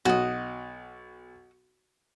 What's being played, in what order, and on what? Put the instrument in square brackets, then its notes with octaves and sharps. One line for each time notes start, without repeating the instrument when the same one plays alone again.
[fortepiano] B1 [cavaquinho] F#4 D#5